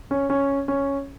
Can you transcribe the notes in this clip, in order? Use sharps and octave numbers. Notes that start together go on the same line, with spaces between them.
C#4
C#4
C#4